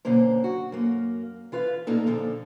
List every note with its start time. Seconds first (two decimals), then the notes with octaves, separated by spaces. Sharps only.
0.05 F#2 B2 D3 A#3 C5
0.44 F#4
0.72 F#2 A#3
1.52 E3 F4 B4 F5
1.87 A#2 A#3 D#4 A4
2.06 A#2 D3 F3 A4